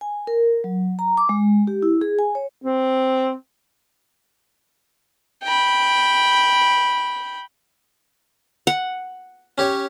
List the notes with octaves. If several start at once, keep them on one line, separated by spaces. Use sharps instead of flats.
G#5
A#4
F#3
A#5
D6
G#3
G4
E4
G#4
G#5
C#5
C4
G5 B5
F#5
C#4 G4 C#5